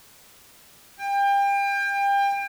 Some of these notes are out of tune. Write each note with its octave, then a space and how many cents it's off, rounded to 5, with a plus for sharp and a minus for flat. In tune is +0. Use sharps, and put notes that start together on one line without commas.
G5 +30